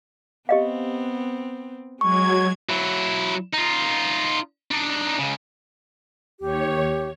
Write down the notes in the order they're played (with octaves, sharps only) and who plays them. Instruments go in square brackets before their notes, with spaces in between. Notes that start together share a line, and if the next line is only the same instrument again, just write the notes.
[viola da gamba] B3 C4 [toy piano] G4 D#5 F5
[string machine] F#3 G#6 [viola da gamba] G#3 [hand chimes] C#6
[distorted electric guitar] F#3 E4
D#4 F4
D4 D#4
C#2 C#3
[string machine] D#2 C#5 [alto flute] G4